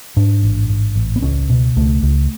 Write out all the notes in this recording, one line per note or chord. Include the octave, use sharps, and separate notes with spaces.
G#2 D4
A1
G#2
A1
B3
C#2 C#4
B2
C#2 A3
C#2